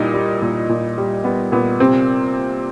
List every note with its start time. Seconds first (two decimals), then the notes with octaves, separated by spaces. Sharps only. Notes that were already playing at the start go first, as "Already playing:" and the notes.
Already playing: A#2 G3 D#4 E4
0.14 G3
0.42 A#2
0.69 A#2
0.98 G3
1.24 G3 B3
1.52 A#2 B3
1.80 C3 C4